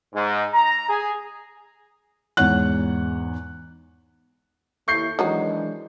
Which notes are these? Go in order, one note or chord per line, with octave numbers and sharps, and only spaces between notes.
G#2
A#5
G#4
E2 G#2 C#5 F#5 F#6
D#2 A3 E4 C#6 G6 C7
D#3 E3 F#3 G#3 D4 D#4